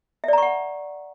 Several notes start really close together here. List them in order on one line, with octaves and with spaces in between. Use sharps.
E5 D5 A#5 C#6 F#5